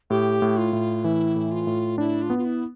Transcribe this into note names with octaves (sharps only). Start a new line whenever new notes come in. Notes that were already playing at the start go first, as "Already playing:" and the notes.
A2 G4
A2
F4
A2
E3 E4
A2
F4
A2
D4 E4
F4
B3
F4
E4